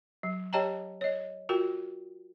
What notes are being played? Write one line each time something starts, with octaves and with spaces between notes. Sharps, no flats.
F#3
G4 C#5 D#5 G5 A5 A#5
C#5 D#5
F4 F#4 A#4 G5